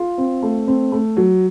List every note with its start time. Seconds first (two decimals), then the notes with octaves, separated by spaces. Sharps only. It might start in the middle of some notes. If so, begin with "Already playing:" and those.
Already playing: F4
0.18 C4
0.43 A3
0.67 C4
0.92 A3
1.17 F#3